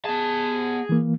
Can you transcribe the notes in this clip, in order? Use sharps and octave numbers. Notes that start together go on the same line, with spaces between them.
B3 G#4 A5
E3 A#3